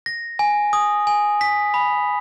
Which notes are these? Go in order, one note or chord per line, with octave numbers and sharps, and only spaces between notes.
A#6
G#5
D#6
G#5
B6
B5